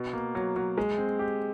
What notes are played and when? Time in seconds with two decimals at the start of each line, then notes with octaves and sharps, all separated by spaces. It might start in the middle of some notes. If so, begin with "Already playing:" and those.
Already playing: B2
0.13 A#3
0.35 F#3
0.56 F#3
0.78 G#3
0.98 C4
1.19 G4